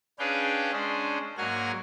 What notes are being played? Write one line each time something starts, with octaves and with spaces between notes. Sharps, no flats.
C#4 D4 G#4 B4 F5 G5
G#3 C#4 D4 C5
G#2 F#3 A#3 F#5 G#5 F6